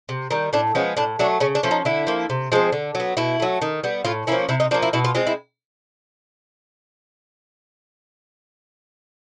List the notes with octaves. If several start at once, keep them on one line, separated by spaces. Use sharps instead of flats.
C3
D#3 G3
A2 D4
F3 G#3 B3 C#4
A2 D4
F#3 A3 D4
C#3 C#4
D4
F3 A3 C#4
D#4
D3 E4
F3 A#3
C3
F3 G#3 C4
D3
F#3 B3
B2 E4
F#3 A3
D#3
G3 B3
A2 F4
F3 A#3 C#4 E4
C3 E4
D#4
F3 A#3 D4
E4
B2 E4
F4
G#3 C4 F4
E4